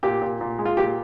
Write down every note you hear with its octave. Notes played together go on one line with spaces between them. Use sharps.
A#2 G4
A#2
A#2
G#3
F4
A#2 G4